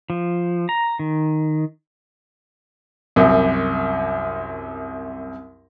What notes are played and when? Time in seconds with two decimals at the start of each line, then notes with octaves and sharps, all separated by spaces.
0.10 F3
0.69 A#5
0.99 D#3
3.16 C2 F#2